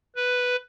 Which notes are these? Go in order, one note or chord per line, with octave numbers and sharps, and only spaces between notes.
B4